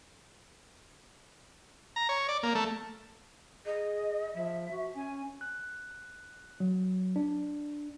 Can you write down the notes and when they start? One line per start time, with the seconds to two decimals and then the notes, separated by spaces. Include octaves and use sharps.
1.96 A#5
2.09 C#5
2.29 D5
2.43 A#3
2.55 A3
3.66 G#4 D#5
4.35 F3 E5
4.71 F#4
4.95 C#4 G#5
5.41 F#6
6.60 F#3
7.16 D4